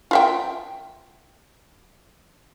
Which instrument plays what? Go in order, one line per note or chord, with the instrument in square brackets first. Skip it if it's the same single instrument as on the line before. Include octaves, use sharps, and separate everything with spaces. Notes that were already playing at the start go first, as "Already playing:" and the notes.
[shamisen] F4 E5 G5